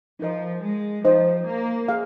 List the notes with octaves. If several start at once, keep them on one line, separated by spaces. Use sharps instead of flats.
F3 D#4 A#4 D#5
G#3
F3 D#4 C5 D#5
A#3
G#4 F5